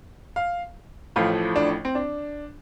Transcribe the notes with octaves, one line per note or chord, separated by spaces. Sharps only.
F5
A1 A2 F3 A3 F5
D4
C4
D4